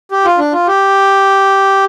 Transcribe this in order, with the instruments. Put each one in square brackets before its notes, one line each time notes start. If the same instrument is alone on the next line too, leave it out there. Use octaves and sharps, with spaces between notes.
[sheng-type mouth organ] G4
F4
D4
F4
G4